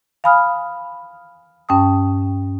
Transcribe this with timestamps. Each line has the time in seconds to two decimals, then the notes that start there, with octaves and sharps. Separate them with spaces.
0.24 F5 G#5 B5 D#6 F6
1.69 G2 C#4 G5 A5 D#6